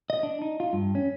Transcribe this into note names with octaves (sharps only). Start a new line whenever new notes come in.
D#5
D4
D#4
F4
G2
C#4